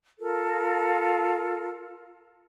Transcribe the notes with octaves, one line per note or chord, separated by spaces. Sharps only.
F4 A4 A#4